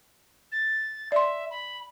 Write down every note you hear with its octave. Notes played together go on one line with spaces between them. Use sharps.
A6
D5 E5 C6
B5